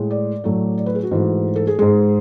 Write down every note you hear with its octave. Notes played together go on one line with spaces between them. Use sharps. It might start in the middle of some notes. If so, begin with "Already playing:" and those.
Already playing: A2 G#3
D5
A2 F#3 A3
D5
B4
G#4
F#4
G#2 E3 A3
A4
G#4
G#2 G#3 G#4